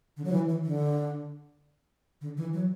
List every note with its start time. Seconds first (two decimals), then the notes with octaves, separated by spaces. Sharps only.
0.17 D3
0.25 F#3
0.32 E3
0.49 E3
0.64 D3
2.21 D3
2.37 E3
2.53 F#3